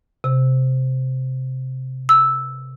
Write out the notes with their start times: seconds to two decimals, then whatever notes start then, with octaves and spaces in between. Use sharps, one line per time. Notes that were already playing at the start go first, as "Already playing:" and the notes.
0.24 C3
2.09 E6